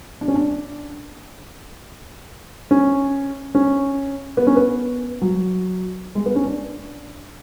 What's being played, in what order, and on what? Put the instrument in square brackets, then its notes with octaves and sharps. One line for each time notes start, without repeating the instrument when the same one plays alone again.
[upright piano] D4
C#4
D4
C#4
C#4
B3
C#4
B3
F#3
G#3
B3
C#4
D4